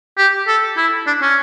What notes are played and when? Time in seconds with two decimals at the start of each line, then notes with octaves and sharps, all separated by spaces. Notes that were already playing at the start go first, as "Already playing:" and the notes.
0.18 G4
0.48 A4
0.77 E4
1.07 D4
1.22 C#4